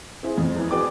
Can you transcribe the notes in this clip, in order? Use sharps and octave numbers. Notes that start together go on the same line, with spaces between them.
C4 E4 G#4
F2
E2 E3
F#4 G#4 B4 D5 G5 D6